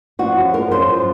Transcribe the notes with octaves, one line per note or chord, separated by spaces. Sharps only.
F3 F#4
F#2
F3 A#4
F#2 C5
F3